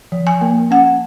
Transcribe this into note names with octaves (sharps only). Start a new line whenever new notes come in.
F3
G#5
A#3
C#4 F#5